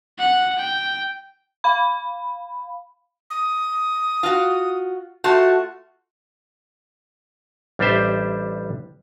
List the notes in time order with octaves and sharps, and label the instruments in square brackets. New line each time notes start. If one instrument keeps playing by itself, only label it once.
[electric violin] F#5
G5
[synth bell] F5 B5
[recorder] D#6
[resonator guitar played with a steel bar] F4 F#4
[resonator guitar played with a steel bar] A3 F4 F#4 [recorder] A5
[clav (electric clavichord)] A1 G3 D4 G4 C5 E5